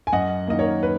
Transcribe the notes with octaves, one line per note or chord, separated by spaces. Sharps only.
G#5
F#2 D#5 F#5
D#3 A#3 D#5
A#4 C#5
B4